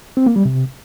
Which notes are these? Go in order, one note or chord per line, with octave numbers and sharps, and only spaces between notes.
C4
A#3
G3
C3